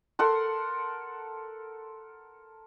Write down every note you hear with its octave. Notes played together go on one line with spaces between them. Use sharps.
A4 A#4 F#5 C6